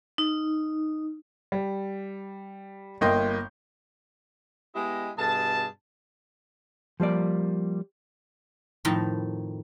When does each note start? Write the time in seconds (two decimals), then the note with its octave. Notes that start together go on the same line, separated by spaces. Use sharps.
0.18 D#4
1.52 G3
3.01 G1 A#3 D#5 G5 C6 G6
4.75 G#3 B3 E4 G4 D#5
5.18 G2 B2 G#4 A5
7.00 F3 G3 A#3 D5
8.85 F2 A2 D#3 D#4 A5 B5